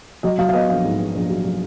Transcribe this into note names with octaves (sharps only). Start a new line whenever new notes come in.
F#3 D#5
F#3 F5
F5
B3 D#5
A#1 F5
G#2
B3
A#1
F#3
F#3